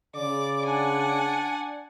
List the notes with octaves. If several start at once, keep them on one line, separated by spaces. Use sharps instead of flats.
C#3 D5 D6
D4 F#5 G#5